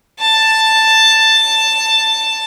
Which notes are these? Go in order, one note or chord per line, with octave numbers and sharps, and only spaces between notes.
A5